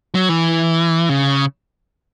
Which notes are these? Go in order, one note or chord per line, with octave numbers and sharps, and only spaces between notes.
F#3
E3
C#3